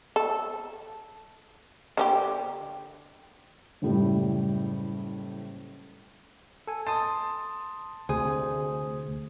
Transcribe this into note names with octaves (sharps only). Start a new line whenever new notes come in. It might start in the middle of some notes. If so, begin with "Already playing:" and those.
A4
D3 C#4 G4
F#1 A2 G3
A4 G#5
A5 C6 D#6
D2 C3 G#4 C5 D#6